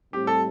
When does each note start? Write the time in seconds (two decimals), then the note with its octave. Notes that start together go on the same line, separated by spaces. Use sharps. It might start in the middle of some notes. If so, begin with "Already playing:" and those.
0.13 A2 G3 C4 G4
0.27 A4